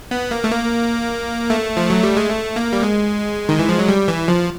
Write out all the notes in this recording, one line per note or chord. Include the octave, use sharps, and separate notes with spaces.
B3
A#3
A3
A#3
A3
F3
F#3
G3
G#3
A3
A#3
G3
G#3
D#3
E3
F3
F#3
G3
E3
F3